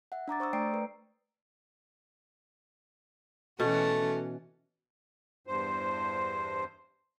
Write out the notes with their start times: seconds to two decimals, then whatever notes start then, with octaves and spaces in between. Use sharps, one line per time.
0.12 E5 F#5
0.28 D4 A#5 D6 A6
0.40 C5 C#6 D#6 E6
0.53 A3 D5 G5 A#5 C7 D7
0.74 B4
3.60 B2 E3 A3 C#4 F#4
5.47 E2 G2 C5